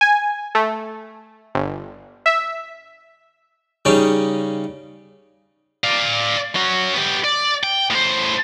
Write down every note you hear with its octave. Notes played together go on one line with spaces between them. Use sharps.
G#5
A3
G1
E5
C#3 G3 C#4 D#4
D5 F5
C#4 F#4
B3 G4
D5
G5
A2 C5